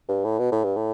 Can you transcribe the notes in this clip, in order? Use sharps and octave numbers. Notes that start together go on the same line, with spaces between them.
G2
A2
B2
A2
G2
A2